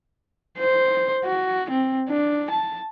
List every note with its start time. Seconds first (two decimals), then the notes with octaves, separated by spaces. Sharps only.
0.59 C5
1.25 F#4
1.71 C4
2.10 D4
2.51 A5